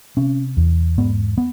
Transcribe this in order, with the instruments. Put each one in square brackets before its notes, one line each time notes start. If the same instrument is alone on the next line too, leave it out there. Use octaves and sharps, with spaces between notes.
[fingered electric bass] C3 C#4
E2
G#2 B3
B3